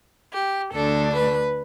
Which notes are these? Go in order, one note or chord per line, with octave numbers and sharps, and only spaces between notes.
G4
D2 D3 A3 D4 A4
B4